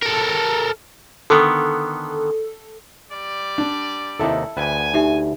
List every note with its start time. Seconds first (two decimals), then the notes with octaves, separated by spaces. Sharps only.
0.03 A4 A#4
1.30 D3 D#3 B3 A4
3.11 G3 D5
3.58 D4
4.20 D#2 C3 D#4 E4 A4
4.57 D2 B4 G5 G#5
4.94 D#4 G4 E5